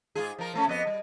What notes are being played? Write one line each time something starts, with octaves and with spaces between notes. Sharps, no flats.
G#2 F4 G#4
F3 A#4
F3 A3 C#4
F2 B3 D#5
G3